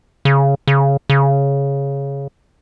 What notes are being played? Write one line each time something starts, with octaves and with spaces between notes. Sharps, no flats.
C#3
C#3
C#3